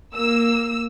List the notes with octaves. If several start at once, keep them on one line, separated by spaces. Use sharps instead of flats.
A#3 E6